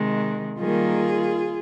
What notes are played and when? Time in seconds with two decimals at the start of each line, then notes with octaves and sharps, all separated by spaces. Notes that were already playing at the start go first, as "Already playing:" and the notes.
Already playing: C3 D#3 G#3
0.60 D#3 G3 A#3 F4 G#4